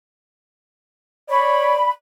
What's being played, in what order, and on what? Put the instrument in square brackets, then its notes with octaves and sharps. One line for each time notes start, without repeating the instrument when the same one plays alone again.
[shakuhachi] C#5 [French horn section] D5 [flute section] B5